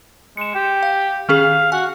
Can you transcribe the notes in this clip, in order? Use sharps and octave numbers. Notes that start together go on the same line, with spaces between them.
G#3 C#7 E7
G4
F5
D#3 C#4 G#4 F5
F#4 G#5